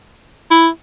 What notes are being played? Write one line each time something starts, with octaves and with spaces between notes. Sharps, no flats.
E4